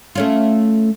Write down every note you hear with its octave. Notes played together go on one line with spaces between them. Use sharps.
A3 C#4 F4